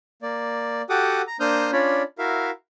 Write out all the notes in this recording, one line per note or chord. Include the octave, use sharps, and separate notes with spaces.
A#3 D5
F#4 G4 A4 F#5 D6 D#6
A#5
A#3 D4 C5 D#6 F6 G6
C#4 D4 F4 C#5 D5 B5
E4 F#4 A#4 E5 F5